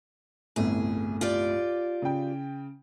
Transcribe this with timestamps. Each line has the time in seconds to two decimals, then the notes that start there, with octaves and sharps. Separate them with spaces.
0.56 G1 C2 A2 G#4
1.21 F4 G4 D5
2.02 C#3 G5